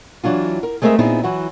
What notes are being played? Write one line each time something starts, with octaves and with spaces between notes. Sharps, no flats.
E3 F#3 D4 F4
A#4
G#3 A3 C4 G#4 A#4 E5
A#2 B3 C4 D#4 E4 G#4
E3 F#3 E4 F#4